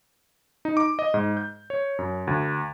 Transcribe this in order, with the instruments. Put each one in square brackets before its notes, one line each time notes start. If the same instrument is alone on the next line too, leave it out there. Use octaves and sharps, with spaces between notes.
[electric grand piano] D#4
D6
D#5
G#2
G6
C#5
F#2
D2